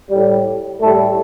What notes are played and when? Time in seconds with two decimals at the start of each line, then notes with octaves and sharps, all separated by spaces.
0.11 A2 G3
0.81 A2 G3 A3 A4